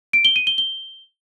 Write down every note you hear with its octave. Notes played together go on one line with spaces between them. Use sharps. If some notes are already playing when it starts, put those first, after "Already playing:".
D7
G7
D#7
G7
G7